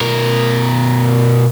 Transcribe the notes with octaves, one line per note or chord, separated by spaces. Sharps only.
B2 A#4